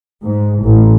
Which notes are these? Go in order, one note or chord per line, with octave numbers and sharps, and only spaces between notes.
G#2
A1